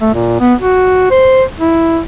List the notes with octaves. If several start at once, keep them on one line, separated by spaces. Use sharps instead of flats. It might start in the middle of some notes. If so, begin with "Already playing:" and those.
A3
A#2
B3
F#4
C5
E4